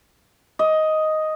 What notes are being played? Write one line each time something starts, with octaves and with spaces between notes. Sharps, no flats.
D#5